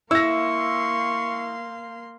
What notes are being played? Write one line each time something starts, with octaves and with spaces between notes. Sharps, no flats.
A#3 E4 F5 C6 C#6 E6 A#6